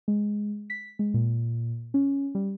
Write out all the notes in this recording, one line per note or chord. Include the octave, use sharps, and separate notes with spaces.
G#3
B6
G#3
A#2
C#4
G3